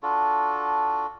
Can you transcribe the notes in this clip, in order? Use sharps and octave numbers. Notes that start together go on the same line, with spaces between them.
D4 F4 F#4 A4